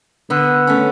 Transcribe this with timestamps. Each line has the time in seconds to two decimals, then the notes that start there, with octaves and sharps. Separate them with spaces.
0.30 D3 B3
0.67 A3 C#4